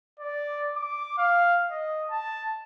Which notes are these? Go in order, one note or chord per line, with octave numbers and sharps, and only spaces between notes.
D5
D6
F5
D#5
A5